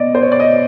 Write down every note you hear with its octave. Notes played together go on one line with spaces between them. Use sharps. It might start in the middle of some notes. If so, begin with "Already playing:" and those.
Already playing: B2 D5 D#5
C5
C#5
D5
D#5